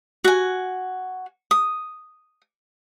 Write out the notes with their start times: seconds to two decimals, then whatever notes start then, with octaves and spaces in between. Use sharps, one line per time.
0.24 F#4 G#5
1.51 D#6